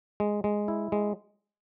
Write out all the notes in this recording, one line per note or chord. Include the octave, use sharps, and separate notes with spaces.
G#3
G#3
E4
G#3